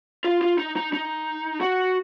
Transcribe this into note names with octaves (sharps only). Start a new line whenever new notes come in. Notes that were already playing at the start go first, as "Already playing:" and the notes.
F4
F4
D#4
D#4
D#4
F#4